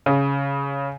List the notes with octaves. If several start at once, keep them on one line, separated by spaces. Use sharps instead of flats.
C#3